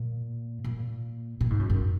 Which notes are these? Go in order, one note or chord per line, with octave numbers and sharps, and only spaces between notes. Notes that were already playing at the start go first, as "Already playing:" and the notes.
Already playing: A#2
A#2
A#2
G#2
F#2
F#2